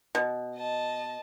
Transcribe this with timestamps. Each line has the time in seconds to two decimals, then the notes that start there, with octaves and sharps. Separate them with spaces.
0.15 B2
0.55 D#5 A5